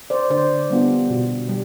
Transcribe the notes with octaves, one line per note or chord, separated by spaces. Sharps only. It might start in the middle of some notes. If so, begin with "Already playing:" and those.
C5 D5
D3 C5 D5
G3 B3 D4 F4
B2
G3